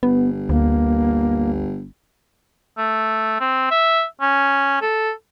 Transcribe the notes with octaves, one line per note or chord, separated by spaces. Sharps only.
G1 B3
D2 A#3
A3
C4
E5
C#4
A4